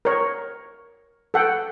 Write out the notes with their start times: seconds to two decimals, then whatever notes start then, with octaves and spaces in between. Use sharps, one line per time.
0.05 A#4 C#5
1.34 A4 F#5 G5